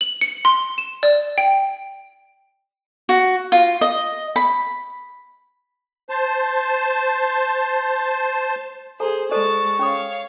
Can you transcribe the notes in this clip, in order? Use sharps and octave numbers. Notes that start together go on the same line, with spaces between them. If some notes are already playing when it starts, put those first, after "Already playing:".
F#7
C#7
C6
E7
D5
G5
F#4
F4
D#5
B5
C5 A5
G#4 A4 C5 A#5
G#3 A4 C5 D5 A5 C#6
C#4 G#4 C#5 F5 D#6